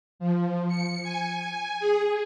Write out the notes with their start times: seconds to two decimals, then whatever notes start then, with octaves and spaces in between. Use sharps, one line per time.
0.19 F3
0.68 C#7
1.03 G#5
1.80 G#4